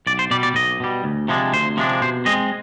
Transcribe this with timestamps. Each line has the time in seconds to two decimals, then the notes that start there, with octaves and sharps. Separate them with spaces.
0.07 B1 D5
0.19 C5
0.31 B2 G3 D5
0.43 D5
0.55 B1 D#5
0.80 B2 G3
1.04 D2
1.28 C3 F3 G#3 D4
1.53 D2 C5
1.77 C3 F3 G#3 D4
2.02 B2 C5
2.26 G#3 C4 D#5